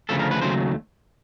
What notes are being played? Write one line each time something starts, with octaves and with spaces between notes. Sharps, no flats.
D2 C#3 F3 A3 A4
A#4
B4
D#2 C#3 F#3 A3 C5